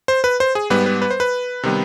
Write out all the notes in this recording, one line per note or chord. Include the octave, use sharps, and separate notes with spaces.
C5
B4
C5
G#4
G#2 G3 B3 B4
B4
B4
C5
B4
C3 D#3 G3 B3